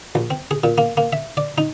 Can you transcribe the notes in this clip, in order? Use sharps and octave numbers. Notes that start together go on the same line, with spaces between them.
A#1
C4
G#4
A#2
A#3
A#3
E5
D5
D#4